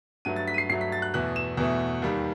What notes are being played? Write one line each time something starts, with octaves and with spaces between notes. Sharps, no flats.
G2 F#3 A3 D#7
A6
B6
D#7
C7
G2 F#3 A3 C7
B6
A6
F#6
E2 B2 A3 F#6
E7
E2 B2 A3
D#2 D#3 G3